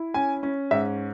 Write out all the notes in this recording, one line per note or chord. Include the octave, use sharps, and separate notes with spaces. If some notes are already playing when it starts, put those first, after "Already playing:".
Already playing: E4
C#4 G#5
C#4
G#2 E5